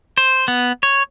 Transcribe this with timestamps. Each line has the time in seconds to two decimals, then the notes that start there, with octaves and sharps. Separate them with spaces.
0.17 C5
0.48 B3
0.83 C#5